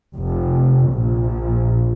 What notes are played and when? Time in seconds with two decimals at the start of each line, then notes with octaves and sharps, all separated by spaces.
0.15 F1
0.91 A#1